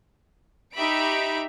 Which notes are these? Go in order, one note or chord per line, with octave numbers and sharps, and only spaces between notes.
D#4 G4 E5 B5 D7